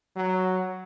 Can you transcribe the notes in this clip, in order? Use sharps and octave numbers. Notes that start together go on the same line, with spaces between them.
F#3